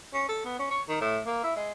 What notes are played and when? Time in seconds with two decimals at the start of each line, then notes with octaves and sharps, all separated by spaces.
0.14 C#4
0.29 A4
0.45 B3
0.59 C#4
0.71 C#5
0.89 D#3
1.01 A2
1.26 A#3
1.44 E4
1.57 G#3